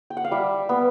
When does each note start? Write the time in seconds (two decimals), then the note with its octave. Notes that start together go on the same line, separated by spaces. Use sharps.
0.10 G5
0.17 F#5
0.24 F5
0.31 G3 E5
0.69 B3